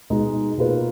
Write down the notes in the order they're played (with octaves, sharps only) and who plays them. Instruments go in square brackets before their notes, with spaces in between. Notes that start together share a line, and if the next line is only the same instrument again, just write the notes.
[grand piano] B2 G#3 D#4
B2 A#3 F4 G#4 B4